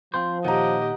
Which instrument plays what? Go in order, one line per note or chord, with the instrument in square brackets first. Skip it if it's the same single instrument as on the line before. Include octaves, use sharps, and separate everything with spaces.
[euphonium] F3 [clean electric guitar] C4 F4 C5
[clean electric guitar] A#2 D#3 [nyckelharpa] G4 D#5 [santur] F#5 A#5